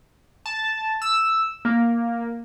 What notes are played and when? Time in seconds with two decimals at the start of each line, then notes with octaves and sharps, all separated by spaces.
0.46 A5
1.02 E6
1.65 A#3